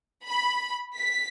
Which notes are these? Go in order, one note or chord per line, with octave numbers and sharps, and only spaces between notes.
B5
B6